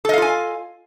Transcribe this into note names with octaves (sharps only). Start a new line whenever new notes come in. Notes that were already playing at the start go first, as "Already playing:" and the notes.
F4 A4 D#5 F5 G#5